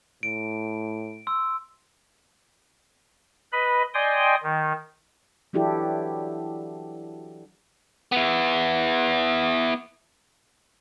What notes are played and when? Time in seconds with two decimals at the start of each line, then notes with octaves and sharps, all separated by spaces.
0.23 A2 D7
1.27 C6 E6
3.52 B4 D#5 B5
3.94 D5 D#5 G5 G#5 C6 D#6
4.43 D#3
5.53 E3 F#3 D4 E4 G4 A4
8.12 B3 E4